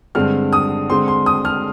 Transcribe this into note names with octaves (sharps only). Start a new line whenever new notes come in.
G2 D3 G#3 C4 F6
D#6
D3 G#3 C4 C6
C6
D#6
F6